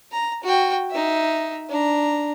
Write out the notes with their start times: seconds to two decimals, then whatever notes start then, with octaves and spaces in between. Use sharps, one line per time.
0.12 A#5
0.44 F#4 G5
0.90 D#4 E5
1.69 D4 A#5